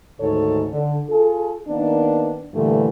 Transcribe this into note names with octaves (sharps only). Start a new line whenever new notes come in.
D2 G#2 D#3 A4 C#5
D3
F4 G#4 A4
D#3 A#3 B3 D4
G2 A#2 D3 E3 A3